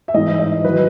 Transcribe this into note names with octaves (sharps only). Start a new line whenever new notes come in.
E5
G#2 E3 D#5
D#5
D#3 F#3 B4